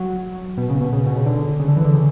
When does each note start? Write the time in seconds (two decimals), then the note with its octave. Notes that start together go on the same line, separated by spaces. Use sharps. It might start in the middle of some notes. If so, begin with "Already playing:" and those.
Already playing: F#3
0.58 B2
0.69 C#3
0.81 B2
0.93 C#3
1.06 B2
1.16 C#3
1.26 D3
1.60 C#3
1.68 D3
1.77 E3
1.85 D3
1.94 C#3